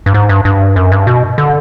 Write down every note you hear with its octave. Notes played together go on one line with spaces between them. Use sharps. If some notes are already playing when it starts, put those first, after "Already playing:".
G2
G#2
G2
G2
F#2
G2
B2
D3